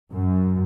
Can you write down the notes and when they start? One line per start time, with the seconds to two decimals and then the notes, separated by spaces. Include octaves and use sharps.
0.12 F#2